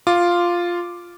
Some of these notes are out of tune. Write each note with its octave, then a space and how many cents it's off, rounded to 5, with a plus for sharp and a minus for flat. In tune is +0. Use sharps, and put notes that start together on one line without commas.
F4 +0 D6 +0